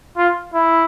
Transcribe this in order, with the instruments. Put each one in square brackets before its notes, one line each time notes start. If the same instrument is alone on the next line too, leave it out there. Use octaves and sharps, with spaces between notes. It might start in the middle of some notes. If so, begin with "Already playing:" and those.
[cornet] F4
E4